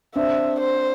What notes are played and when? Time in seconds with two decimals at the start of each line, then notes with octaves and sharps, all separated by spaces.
0.16 C4 D4 E5
0.60 C5